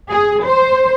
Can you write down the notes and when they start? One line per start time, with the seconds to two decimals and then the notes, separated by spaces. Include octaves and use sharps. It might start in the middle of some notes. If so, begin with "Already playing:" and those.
0.10 G#4
0.45 C5